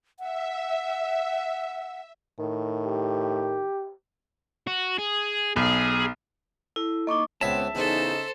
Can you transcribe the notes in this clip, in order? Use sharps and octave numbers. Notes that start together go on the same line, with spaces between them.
E5 F#5
A2 D#3
G4
F#4
G#4
B1 G#4
E4 A4
A#3 D#4 D#5 C#6 D6
C#2 B3 C4 C#5 D5 E5 A5
E2 C#3 D#4 A4 C5